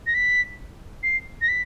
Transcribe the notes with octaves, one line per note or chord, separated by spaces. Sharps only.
A#6
B6
C7
A#6
B6